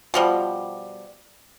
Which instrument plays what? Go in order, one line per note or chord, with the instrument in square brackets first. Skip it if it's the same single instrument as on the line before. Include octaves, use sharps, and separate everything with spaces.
[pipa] B2 F3 G3